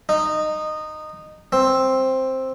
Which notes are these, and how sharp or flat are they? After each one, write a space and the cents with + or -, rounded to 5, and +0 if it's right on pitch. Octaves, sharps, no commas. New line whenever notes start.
D#4 -15
C4 +5